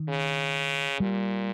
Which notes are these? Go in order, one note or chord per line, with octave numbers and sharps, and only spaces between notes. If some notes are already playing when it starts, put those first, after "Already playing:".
Already playing: D#3
C#3
A#2 G3